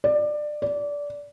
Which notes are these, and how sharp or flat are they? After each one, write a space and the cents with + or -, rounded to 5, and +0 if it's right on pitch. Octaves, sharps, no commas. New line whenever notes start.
D5 +20
D5 -20